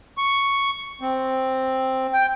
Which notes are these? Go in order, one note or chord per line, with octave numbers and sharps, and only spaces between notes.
C#6
C4
G5